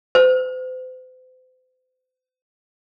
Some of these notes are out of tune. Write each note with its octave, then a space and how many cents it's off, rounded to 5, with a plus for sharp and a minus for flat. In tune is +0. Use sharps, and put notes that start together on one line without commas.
C5 -40